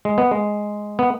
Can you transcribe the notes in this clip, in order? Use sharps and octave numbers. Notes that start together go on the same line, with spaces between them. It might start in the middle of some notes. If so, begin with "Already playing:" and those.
G#3
B3
G#3
B3